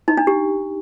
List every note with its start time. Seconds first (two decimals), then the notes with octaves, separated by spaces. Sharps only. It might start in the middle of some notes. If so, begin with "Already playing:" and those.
0.08 D#4
0.17 D4
0.27 G4